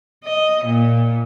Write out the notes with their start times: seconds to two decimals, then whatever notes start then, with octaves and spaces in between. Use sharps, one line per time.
0.24 D#5
0.64 A#2